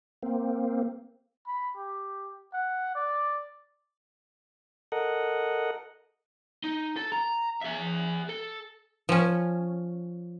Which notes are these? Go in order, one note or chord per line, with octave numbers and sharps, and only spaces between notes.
A#3 C4
B5
G4
F#5
D5
A4 A#4 D#5 F#5
D#4
A4
A#5
G#4 E5
A4
F3 C#4